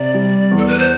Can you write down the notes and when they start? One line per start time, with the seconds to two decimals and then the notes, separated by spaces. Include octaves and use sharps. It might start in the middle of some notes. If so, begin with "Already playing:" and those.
Already playing: C3 D5
0.14 G3
0.51 E2
0.57 A4
0.68 B4
0.79 C5